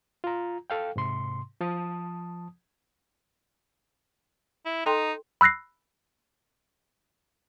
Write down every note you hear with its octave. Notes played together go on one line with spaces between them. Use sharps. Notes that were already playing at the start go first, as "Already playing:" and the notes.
F4 A#5
A4 F5 G5
G#2 C3 C6
F3 A5 D#6
E4
D#4 A4 G5 C6
B5 E6 F#6 A#6 C7